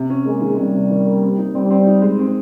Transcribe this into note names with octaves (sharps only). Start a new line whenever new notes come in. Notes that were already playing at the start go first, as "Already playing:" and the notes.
Already playing: C3
C#4
G#3 A#3
D#3
C3 G3
C3
D#3
A#3
C4
D#4
G3 C4
C4
D#4
G#3
C4